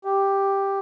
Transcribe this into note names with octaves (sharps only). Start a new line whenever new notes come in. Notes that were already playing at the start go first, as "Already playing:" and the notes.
G4